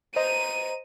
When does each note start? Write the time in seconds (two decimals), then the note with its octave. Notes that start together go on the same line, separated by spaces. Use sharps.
0.16 C5 D#5 A#5 D#7